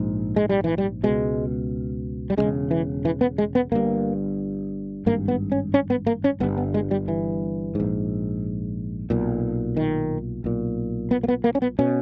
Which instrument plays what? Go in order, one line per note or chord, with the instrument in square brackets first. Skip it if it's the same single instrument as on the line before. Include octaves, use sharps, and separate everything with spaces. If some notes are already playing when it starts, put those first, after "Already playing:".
Already playing: [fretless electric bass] A#1 G#2
G#3
G3
E3
G3
C#2 B2 G#3
G3
E1 D#2 C#3 G#3
E3
E3
B3
G#3
B3
G1 G2 A#3
G#1 G2 A#3
B3
C#4
C#4
B3
A#3
C#4
G1 B3
G2
B3
G#3
G3
E3
A#1 G#2
B1 A#2
D#3
B1 A#2
B3
A#3
B3
A#3
C#4
B3
B2 C#4